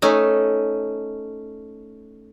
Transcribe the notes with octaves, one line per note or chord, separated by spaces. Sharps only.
A3 C#4 D#4